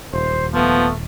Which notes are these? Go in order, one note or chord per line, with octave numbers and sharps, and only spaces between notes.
D#1 C5
F3 A3 B3